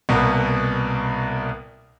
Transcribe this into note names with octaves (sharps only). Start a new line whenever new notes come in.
C2 B2 A#3 B3